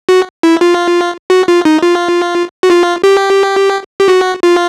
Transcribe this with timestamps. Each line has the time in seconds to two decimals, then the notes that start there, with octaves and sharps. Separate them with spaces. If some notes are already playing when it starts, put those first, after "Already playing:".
0.09 F#4
0.43 E4
0.61 F4
1.30 F#4
1.48 F4
1.65 D#4
1.82 F4
2.63 F#4
2.70 F4
3.04 G4
4.00 G4
4.08 F#4
4.43 F4